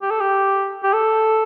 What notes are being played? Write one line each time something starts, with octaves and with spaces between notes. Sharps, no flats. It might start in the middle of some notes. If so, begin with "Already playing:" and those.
G4
A4
G4
G4
A4